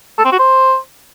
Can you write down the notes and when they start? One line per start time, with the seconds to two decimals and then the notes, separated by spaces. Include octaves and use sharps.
0.18 A4
0.25 C4
0.32 F#4
0.39 C5